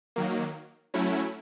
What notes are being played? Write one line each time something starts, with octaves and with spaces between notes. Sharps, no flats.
D#3 F#3 A#3
F#3 A3 C#4 E4